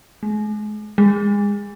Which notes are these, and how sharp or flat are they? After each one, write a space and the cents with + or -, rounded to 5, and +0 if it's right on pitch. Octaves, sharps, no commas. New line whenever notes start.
G#3 +35
G#3 -30